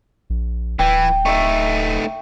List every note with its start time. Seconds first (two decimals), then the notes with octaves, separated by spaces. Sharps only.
0.30 A#1
0.79 D1 E3 G5
1.25 A3 D#4 E5 C#6